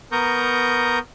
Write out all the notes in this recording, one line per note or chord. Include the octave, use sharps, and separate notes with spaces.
B3 A#4 A#5 C#6 D#6 G6